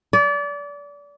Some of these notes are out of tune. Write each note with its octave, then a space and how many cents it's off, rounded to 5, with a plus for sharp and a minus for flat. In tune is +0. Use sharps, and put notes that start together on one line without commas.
D5 -30